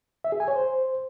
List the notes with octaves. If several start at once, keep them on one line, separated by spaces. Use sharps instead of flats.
E5
G#4
G#5
C#5
C5